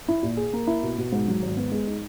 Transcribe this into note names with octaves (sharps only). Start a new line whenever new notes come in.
E4
A#2
G#4
A#3
E4
B2
B2
G#2
F#3
G#1
B3
G#3
D#4